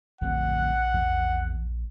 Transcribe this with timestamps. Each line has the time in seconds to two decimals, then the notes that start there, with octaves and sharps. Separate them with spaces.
0.21 D1 A#1 F2 C4 F#5
0.94 E2